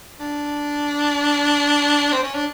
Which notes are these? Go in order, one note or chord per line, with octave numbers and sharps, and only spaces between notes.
D4
C4
C#4
D4